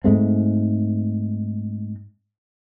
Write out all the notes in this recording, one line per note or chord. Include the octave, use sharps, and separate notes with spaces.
G#2 G#3 A3 C4